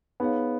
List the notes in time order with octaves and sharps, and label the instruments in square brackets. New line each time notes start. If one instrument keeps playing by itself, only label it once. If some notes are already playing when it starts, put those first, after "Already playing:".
[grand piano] B3 [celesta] D#4 G#4 C#5 F5